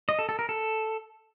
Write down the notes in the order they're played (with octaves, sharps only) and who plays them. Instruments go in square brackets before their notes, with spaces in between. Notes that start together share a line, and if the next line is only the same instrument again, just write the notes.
[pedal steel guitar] D#5
A4
A4
A#4
A4